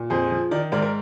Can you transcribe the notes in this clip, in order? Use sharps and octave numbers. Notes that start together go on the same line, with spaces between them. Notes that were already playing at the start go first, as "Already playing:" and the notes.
Already playing: A#2
F2 G#4 C5
F3
D#3 A#4 D5
G#2 A#4 D5
A#4 D5